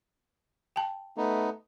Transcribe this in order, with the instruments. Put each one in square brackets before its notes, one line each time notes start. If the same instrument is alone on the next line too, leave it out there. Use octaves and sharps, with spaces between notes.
[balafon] G5 A5
[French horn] A3 [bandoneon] B3 D#4